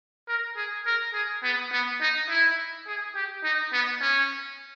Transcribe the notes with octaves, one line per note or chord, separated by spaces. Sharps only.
A#4
G#4
A#4
G#4
B3
B3
D#4
E4
G#4
G4
D#4
B3
C#4